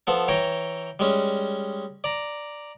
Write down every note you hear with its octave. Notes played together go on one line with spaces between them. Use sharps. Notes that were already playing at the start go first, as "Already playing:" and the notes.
F3 B3 A4
E3 C#5 G5 A#5
G3 G#3 C#4
D5 A#5